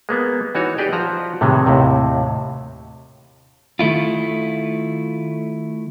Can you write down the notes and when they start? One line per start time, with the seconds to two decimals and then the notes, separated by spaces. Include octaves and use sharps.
0.09 G#3 A#3 B3
0.55 E3 D#4 F#4 C#5
0.78 G4 G#4 B4 D5 D#5 G5
0.93 F3 F#4 A#5
1.41 A2 C3 D#3 E3 G#3
1.66 D#2 A2 C3
3.79 D#3 A3 E4 F4